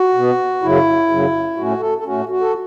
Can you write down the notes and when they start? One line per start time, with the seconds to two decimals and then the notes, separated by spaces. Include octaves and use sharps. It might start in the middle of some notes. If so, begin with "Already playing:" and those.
Already playing: F#4
0.14 B2 B3
0.62 F#2 C#3 F#3 E4
1.09 F#2 C#3 F#3
1.56 A2 A3 C#4 F#4
1.80 A4
1.98 A4
2.04 A2 A3 C#4 F#4
2.29 F#4
2.41 A4